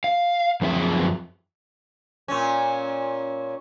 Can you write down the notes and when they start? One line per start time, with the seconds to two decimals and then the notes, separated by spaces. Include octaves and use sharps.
0.04 F5
0.61 F#2 F3 C4 G#4 E5
2.28 A#2 C#4